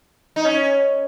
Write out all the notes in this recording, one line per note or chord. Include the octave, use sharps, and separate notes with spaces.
D#4
C#4